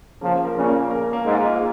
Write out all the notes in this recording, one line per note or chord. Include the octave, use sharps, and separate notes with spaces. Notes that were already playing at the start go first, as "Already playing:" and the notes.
C#3 F3 A#3
A#4
A#2 C#3
A#3
A#4
A#3
G#2
F4